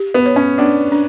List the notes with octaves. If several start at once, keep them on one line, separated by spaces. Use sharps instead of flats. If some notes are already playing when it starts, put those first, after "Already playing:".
Already playing: G4
B3
C#5
C#4
B3 D4
D4